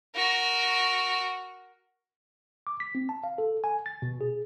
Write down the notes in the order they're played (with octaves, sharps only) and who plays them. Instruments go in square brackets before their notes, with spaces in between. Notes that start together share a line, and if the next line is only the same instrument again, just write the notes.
[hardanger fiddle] F#4 A#4
[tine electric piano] D6
B6
C4
A5
F5
A4
G#5
A6
B2
G#4